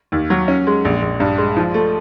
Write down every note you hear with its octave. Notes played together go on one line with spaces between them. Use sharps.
D#2
F#3
C#4
G#3
A#1
A#1
G2
G#3
F3
A3